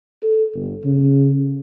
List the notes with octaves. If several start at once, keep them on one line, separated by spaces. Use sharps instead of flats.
A4
G1
C#3